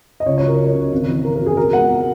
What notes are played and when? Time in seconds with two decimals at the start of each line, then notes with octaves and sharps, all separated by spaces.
0.20 D#5
0.26 C#2 C#5
0.38 F#3 C#5
0.48 A#4
0.59 C#2
0.75 C#3
0.92 G#1
1.08 E3
1.24 B3 A#4
1.36 A#4
1.41 F#2
1.46 G#4
1.57 B1 A#4
1.73 G#3 F#5
1.90 B3